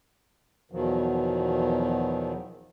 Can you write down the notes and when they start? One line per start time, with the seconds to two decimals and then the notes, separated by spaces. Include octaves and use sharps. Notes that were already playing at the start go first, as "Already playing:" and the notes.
0.72 E2 B2 D#3 F3 F#3